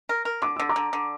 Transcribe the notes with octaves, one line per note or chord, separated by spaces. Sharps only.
A#4
A#4
D3 D6
D3 E6
A#5 D6
D3
D3